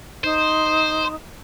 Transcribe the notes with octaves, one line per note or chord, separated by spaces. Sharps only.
D#4 C5